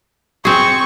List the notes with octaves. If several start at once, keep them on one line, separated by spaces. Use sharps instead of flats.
C4 G#4 C#6